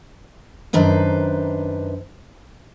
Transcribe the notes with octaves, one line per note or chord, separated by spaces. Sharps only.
F#2 D#3 D4 B4 C5